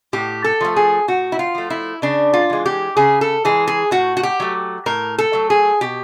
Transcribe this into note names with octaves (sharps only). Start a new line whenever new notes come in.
A2 G4
A4
F3 A3
G#4
A2 F#4
E4
F4
F3 A3
E4
C#3 D4
F4
E3 G#3
G4
C#3 G#4
A4
E3 G#3 G#4
G#4
A2 F#4
F#4
G4
F#3 A3
A2 A#4
A4
F#3 A3
G#4
B2 G4